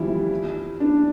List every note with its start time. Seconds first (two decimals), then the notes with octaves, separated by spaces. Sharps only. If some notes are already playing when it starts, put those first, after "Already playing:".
Already playing: E3 F3 G3 E4
0.80 D4